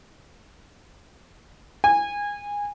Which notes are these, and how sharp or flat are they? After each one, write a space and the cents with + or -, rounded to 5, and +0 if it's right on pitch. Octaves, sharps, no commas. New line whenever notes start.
G#5 -20